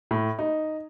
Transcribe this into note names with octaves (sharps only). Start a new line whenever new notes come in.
A2
D#4